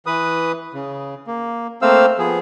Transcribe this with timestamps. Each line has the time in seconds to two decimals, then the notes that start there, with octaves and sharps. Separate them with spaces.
0.06 E3 B4 D#6
0.74 C#3
1.27 A#3
1.82 A3 A#3 C4 C5 F5 E6
2.18 F3 B3 G#4